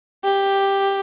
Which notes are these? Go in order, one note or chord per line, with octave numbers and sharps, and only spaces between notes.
G4